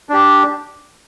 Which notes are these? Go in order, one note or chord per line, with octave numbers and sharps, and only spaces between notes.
D4 G4